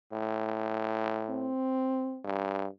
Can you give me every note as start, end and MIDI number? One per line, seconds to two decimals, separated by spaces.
0.12 1.50 45
1.30 2.22 60
2.25 2.67 43